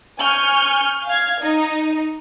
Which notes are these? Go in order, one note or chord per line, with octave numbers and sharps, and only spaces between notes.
G#5 C#6 F6 G6
F5 G#6
D#4